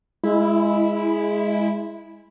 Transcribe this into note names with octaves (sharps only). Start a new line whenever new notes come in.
G#3 E4